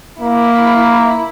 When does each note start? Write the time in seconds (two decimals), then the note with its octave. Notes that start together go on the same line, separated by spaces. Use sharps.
0.20 A#3 E4